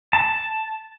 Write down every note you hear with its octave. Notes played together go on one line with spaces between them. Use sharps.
A5